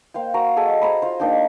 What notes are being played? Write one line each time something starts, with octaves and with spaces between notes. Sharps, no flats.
A#3 C5 F5 G5
F#4 A#4 A#5 C#6
G#4 A4 D#5 G#5
G#4 C5 A#5 B5
F4 C5
A#3 D4 D#4 G5